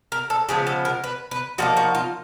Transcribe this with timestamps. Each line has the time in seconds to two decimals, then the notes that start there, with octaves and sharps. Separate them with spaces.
0.12 A#4
0.30 A4
0.49 C#3 F3 G#3 B3 G#4
0.67 A4
0.85 A#4
1.04 B4
1.31 B4
1.58 F3 A#3 D#4 F#4
1.77 F#4
1.95 F4